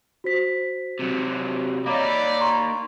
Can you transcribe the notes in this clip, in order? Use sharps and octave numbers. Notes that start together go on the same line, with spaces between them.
F#4 C5 B6
C3 F#3
A#3 D#4 C#5 D5 A#5 B5 D6
A#5 C6 C#6